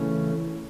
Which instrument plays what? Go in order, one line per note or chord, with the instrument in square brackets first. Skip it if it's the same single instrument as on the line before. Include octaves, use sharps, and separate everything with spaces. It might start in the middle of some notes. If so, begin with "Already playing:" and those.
Already playing: [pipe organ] C#3 E3 A3 C#4